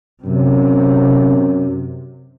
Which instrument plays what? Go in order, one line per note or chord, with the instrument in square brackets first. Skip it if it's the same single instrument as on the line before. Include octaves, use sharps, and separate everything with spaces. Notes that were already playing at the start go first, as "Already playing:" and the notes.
[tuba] F#2 [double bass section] C3